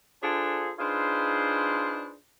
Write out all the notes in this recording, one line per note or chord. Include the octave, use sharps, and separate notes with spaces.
D4 F4 G#4 A4 C5 G#5
D4 D#4 F4 G#4 B4 C5